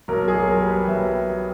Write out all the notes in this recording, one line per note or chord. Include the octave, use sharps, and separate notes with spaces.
B1 A#4
G#4
B1
A#4
G3
B4
B1 E5
G3